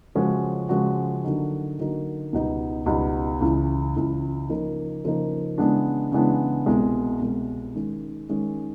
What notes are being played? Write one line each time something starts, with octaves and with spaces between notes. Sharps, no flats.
C#3 F3 G#3 C#4 F#4
C#3 F3 G#3 C#4 F#4
D3 F#3 A#3 D#4 F#4
D3 F#3 A#3 D#4 F#4
C#2 B2 G3 B3 D#4
C#2 B2 G3 B3 D#4
C#2 C#3 E3
C#2 C#3 E3
C#3 F3 A#3 D#4
C#3 F3 A#3 D#4
C#3 E3 G#3 B3 D4
C#3 E3 G#3 B3 D4
C2 B2 G#3
C2 B2 G#3
D#3 G#3 C#4
D#3 G#3 C#4